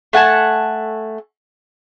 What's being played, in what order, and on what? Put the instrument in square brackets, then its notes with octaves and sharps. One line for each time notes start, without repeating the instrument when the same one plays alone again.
[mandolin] A3 F#5 G#5 A5